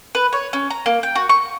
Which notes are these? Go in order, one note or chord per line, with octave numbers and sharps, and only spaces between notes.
B4
C#5
C#4
A#5
A#3
G5
F#4
C#6